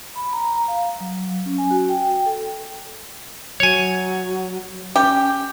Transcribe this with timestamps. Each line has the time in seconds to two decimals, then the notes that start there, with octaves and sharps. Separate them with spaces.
0.16 B5
0.33 A#5
0.68 F5
1.00 F#3
1.46 C#4
1.58 G#5
1.71 F#4
1.89 G5
2.10 G5
2.26 A4
3.60 F#3 C#5 G#5
4.96 C#4 G4